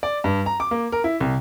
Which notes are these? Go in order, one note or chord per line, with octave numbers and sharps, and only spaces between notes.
D5
G2
A#5
D6
A#3
A#4
E4
C2